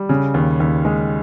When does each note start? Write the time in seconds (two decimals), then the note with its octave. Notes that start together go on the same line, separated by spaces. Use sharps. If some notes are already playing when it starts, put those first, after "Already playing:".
Already playing: G3
0.09 C#3
0.34 D#2
0.60 D#2
0.85 G#3